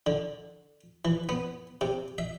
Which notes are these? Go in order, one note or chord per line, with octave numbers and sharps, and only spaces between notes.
D3
E3
B3
C3
E5